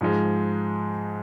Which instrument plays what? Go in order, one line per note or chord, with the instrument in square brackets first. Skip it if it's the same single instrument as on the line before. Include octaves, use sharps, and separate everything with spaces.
[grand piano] G#2 F3 G#3